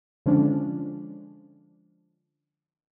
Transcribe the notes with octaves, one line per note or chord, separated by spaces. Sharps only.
D3 F3 G#3 C#4 D4